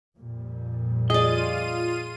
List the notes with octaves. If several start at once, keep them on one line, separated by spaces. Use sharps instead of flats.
F2 A#2 G3
F4 G#4 D5 D#5 D#7